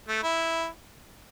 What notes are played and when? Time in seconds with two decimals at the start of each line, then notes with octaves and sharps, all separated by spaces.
0.08 A3
0.23 E4